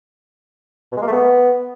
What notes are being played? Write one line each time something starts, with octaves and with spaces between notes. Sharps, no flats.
B2
G#3
A#3
A3
B3